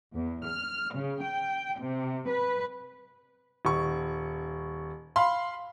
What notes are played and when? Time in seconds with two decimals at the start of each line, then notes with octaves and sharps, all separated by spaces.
0.13 E2
0.45 F6
0.93 C#3
1.22 G5
1.80 C3
2.28 B4
3.65 D#1 C#6
5.16 F5 B5 C6